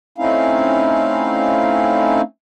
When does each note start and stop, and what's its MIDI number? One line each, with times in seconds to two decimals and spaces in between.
0.18 2.21 57
0.18 2.21 60
0.18 2.21 61
0.18 2.21 63
0.18 2.21 64
0.18 2.21 77